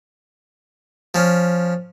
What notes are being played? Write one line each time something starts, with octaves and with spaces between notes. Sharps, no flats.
F3 C#4